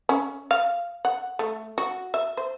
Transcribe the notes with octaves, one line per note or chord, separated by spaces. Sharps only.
C#4
F5
F#5
A3
F#4
E5
C5